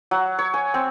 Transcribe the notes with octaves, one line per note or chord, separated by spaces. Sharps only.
F#3
C#5
G#5
C4